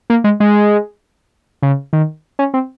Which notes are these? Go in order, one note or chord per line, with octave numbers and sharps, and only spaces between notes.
A#3
G#3
G#3
C#3
D#3
C#4
C4